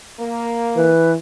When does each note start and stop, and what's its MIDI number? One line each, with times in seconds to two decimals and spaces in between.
0.19 0.92 58
0.76 1.15 52
0.76 1.13 71